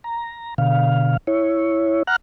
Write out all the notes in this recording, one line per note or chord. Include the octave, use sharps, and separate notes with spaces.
A#5
B2 D3 F5
E4 C#5
F#5 A#5 F6 F#6